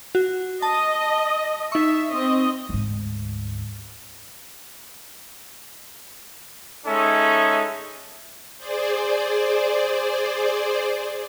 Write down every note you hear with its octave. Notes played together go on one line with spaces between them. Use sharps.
F#4
D#5 A5
D#4 E5 C#6
C4 D#5
D2 G#2
G#3 C#4 D#4 A4 E5
G#4 C5 D5